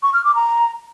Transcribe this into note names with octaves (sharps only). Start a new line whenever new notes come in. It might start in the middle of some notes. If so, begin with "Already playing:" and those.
C#6
F6
D6
A#5